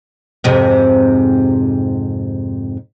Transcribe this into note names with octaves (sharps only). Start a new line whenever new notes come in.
F2 G#2 C3